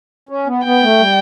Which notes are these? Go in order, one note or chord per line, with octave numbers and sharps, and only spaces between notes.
C#4
B3
B3 G5
A3
G3